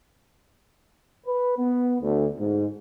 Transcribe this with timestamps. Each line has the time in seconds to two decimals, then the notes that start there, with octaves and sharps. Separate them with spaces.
1.26 B4
1.58 B3
2.01 D2
2.39 G#2